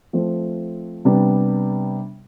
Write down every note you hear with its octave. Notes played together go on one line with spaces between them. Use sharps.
F3 A3 C4
C3 G3 B3 D4